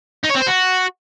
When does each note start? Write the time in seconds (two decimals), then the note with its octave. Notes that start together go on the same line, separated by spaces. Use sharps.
0.24 D#4
0.29 C#5
0.35 C4
0.41 C5
0.46 F#4